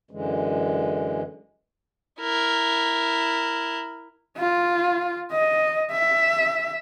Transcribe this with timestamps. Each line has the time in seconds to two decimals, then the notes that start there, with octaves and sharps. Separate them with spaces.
0.11 F#2 D3 E3 G#3
2.20 E4 A#4
4.38 F4
5.33 D#5
5.92 E5